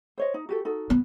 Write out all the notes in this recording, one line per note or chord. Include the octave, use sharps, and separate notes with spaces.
C5 C#5 D#5
D#4
F#4 G4 A4
D#4 F#4 A4
B3